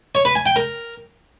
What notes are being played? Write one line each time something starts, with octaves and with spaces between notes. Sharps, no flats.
C#5
B4
G#5
G5
A#4